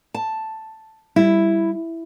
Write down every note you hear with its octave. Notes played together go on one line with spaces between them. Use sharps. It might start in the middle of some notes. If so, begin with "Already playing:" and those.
A5
G3 E4